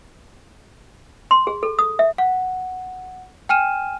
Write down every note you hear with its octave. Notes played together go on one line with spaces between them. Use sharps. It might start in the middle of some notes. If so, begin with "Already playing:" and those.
C6
G#4
A4
D#6
E5
F#5
G5 G#5 F6 D#7 E7